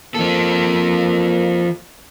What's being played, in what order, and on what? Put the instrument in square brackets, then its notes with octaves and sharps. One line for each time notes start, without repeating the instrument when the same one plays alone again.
[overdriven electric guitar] F3 A4 [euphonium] A#3